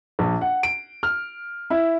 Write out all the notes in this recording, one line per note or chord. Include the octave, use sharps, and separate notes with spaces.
A#1
F#5
D7
F6
E4